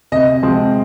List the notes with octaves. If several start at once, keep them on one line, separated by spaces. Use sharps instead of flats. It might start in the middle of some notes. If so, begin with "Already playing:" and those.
C3 D#5
F3 G#3 C4